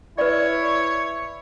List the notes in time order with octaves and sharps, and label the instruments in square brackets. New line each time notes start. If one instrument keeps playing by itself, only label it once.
[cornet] E4 [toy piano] B4 D5 [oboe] C#5